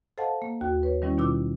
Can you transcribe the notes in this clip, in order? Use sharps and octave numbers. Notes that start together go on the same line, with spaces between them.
A4 C5 D#5 F5 F#5 A5
A#3
D#2 F#4
B4 C#5
D#3 G3 C#4 E4
B2 D#3 D#4 F4 D6 E6